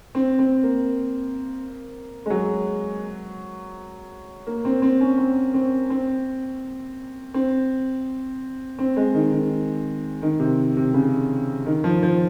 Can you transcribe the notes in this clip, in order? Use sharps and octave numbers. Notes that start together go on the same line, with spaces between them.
C4
C4
A#3
G#3
F#3
A#3
C4
C4
C#4
C4
C4
C4
C4
C4
G#3
D#3
D#3
D#3
C3
C3
C#3
D#3
F3
F3